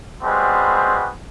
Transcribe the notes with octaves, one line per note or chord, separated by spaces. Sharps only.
G3 G#3 B3 C4 F#4